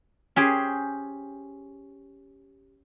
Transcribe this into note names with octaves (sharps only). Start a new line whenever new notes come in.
C#4 G4 G#4 C5